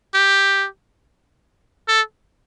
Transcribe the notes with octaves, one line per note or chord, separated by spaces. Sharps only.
G4
A4